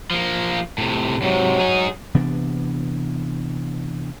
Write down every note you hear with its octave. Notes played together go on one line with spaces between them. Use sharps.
F3 A#3
A2 C3
G#2 C3 F#3
D#4 G#4
C3 E3 B3 D4